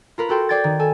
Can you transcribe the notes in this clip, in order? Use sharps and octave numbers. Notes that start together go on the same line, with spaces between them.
F4 A#4 B4
F#4 A4 G5 C6
C5 D5 G5 G#6 A6
D#3
A4 G#5